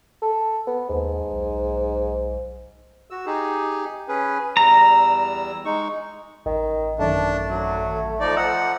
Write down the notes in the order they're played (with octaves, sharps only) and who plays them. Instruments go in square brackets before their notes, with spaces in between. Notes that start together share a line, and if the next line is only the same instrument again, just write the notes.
[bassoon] A4
B3
[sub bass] D#2 [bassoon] G#2
[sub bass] B1
[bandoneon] F#4 E6
D#4 G4 G#4
C#4 G#4 B4
[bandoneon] E2 G3 E6 [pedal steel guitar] A#5
[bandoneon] G#3 D#4 C#6
[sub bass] A1 [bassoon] D#3
[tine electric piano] F#2 D#3 [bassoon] A3 [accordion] D4
[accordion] F#3
F3 D#4 D5
[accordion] F3 F#5 [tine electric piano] D#5 A#5 E6